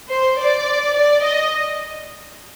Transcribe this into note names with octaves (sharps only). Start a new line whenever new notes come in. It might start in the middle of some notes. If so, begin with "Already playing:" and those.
C5
D5
D5
D#5